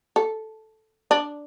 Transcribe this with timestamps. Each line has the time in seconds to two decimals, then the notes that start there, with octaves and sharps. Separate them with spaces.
0.16 A4
1.11 D4